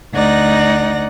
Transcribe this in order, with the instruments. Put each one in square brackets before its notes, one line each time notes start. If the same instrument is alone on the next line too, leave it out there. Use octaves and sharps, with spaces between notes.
[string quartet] D2 D#4 D5 F#5 A#6